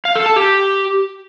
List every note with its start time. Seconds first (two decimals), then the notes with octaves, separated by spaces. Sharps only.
0.05 F5
0.16 A4
0.26 A5
0.36 G4